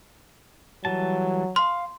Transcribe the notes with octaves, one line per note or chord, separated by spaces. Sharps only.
E3 F#3 G3 A5
F5 C6 F6